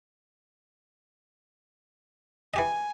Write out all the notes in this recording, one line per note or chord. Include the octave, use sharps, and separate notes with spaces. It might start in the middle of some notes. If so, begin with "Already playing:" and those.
E3 G4 D#5 G#5